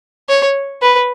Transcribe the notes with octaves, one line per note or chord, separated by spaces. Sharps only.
C#5
B4